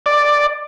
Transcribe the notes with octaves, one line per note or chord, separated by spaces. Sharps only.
D5